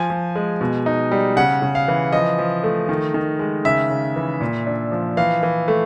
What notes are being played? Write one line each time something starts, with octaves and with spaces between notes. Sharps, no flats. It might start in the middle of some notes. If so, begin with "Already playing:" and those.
Already playing: F3 G#5
F3
G#3
B2
D#4
G3
C#3 F#5
C#3
F5
E3
F3 D#5
F3
A3
D#3
D#3
G#3
C#3 E5
C#3
E3
A#2
D4
F3
E3 F5
E3
A3